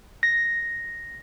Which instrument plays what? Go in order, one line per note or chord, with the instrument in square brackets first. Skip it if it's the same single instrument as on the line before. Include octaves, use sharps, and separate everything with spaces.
[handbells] A#6